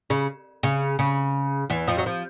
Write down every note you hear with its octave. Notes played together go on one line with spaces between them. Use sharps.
C#3
C#3
C#3
E2 E3
F2 F3
F#3
F3